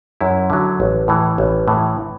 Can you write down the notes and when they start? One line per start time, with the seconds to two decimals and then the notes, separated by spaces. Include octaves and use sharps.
0.21 F#2 E4
0.50 D3 F#3
0.80 A1
1.08 A2 E3
1.38 A1
1.68 A2 E3